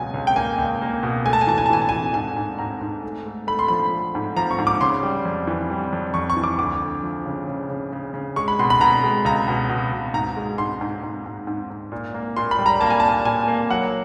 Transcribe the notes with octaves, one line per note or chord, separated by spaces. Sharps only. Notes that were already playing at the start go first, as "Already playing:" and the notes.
Already playing: C#2 B2 F#3 G#5
C#2
G5
A#3 G#5
C#2
A#3
B2
A3 G#5
A5
G#5
E3 A5
G#5
A5
E3 G#5
A5
G#5
E3
G#2 G#5
G#2
G#2 A#5
G#2
A3
A3
A3 B5
C6
F3 B5
A3
G#2
F3 A#5
C#6
G#2
D6
C#3 C6
G3
F2
E3
G3
F2
F2 C#6
C#6
E3
D6
D2 D6
D2
F3
C#3
C#3
C#3
C#3
C#3
G#3 C#6
B5
B2 C6
B5
B2 A#5
G#3
C#2 A#5
B2
B2
B2
G#2 A#5
G#3
G#2 C6
G#2
G#2
G#2
G#2
G#2
A#2
A#3
A#2 C6
B5
G3
A#5
A#3 A5
G#5
A5
A#2
A#2 G#5
A#3
F#3 F#5